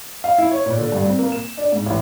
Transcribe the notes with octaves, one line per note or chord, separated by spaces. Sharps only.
F5
E4
C#5
A#2
D3
G2
C4
A#3
E7
D4
G#2
A1